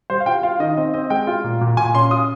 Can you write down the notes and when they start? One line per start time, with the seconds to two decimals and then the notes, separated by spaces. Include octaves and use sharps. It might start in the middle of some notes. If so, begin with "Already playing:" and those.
0.10 G3 C5
0.20 F5
0.26 F4 G5
0.43 F4 F5
0.59 D#3 D#5
0.77 C4 D#5
0.94 C4 D#5
1.10 G#3 G5
1.27 F4
1.44 A#2
1.61 A#2
1.77 A#2 G#5
1.94 C#4 C6
2.11 F4 D#6